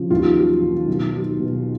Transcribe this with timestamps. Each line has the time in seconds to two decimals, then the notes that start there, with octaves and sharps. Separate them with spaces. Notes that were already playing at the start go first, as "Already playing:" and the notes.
Already playing: C#3 F3
0.10 D#2 F4
0.36 F#3
0.62 D#3
0.88 B1
1.13 F#3
1.39 B2